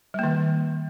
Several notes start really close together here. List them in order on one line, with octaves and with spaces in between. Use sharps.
G3 A#3 D#3